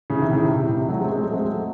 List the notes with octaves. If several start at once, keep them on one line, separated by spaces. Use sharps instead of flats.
A2 C#3
C3 D#3
A2 C#3
C3
C3
A2
C3
F#3 A3
G#3 C4
G#3 C4
F#3 A3
G#3 C4
F#3 A3